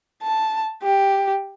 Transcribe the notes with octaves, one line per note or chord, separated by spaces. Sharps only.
A5
G4